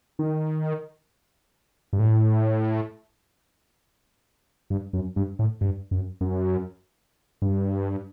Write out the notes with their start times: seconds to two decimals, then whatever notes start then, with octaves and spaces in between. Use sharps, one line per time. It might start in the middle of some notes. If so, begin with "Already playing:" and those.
0.19 D#3
1.93 G2
1.99 A2
4.70 G2
4.93 F#2
5.16 G2
5.39 A2
5.61 G2
5.91 F#2
6.21 F#2
7.42 G2